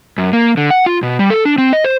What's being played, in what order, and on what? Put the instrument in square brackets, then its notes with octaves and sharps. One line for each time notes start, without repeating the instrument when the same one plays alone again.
[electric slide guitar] F#2
A#3
D3
F#5
F4
B2
G3
A4
D4
C4
D#5
C5